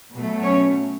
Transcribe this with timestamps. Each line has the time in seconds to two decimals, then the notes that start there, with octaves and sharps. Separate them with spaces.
0.14 B2 F#3 A3
0.43 C#4 C#5